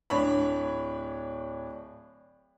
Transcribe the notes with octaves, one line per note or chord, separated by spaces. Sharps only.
D1 D4 C#5 B5